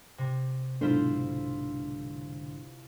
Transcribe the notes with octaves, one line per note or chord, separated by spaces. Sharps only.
C3
B1 G#2 D3 E4 F4 C5